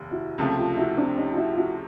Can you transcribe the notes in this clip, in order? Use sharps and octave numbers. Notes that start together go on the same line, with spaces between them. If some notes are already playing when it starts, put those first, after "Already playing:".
Already playing: F1 D#2
E4 F#4
C#2 C3 F3 A3
F4 G4
E4 F#4
C4 D4
C#4 D#4
F4
E4 F#4
F4
E4 F#4